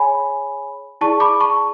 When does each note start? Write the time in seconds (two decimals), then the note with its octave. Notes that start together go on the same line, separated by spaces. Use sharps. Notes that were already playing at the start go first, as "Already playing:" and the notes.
Already playing: G#4 C#5 G#5 B5
1.01 E4 G#4 D5 A5 C#6
1.20 B5 D6
1.41 A5 C#6